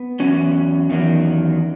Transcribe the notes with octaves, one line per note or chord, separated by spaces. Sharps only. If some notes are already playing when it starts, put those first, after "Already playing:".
Already playing: B3
E2 D#3 F#3 C#4
E2 D#3 F#3